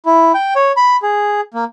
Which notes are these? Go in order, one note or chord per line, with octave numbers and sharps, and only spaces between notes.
E4
G5
C#5
B5
G#4
A#3